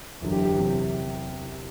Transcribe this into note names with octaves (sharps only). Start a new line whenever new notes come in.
F#1 E2 D3 F#3
G4
G4
E2 C3 F#3